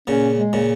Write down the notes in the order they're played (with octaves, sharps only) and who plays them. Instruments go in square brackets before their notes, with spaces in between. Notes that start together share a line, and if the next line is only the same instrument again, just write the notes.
[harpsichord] A#2 C#3 [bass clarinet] C#4
[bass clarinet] G#3
[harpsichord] A#2 C#3